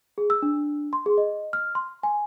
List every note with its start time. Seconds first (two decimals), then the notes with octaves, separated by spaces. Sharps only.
0.18 G#4
0.30 E6
0.42 D4
0.93 C6
1.06 G#4
1.18 D#5
1.53 F6
1.75 C6
2.03 G#5